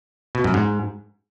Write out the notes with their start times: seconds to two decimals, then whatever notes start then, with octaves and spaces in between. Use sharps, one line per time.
0.35 B2
0.44 F#2
0.54 G#2